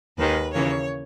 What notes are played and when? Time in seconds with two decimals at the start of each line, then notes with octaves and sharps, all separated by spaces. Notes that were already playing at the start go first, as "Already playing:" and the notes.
0.18 D#2 D#3 G#3 B4
0.53 D#2 C#3 E3 A#3 C#5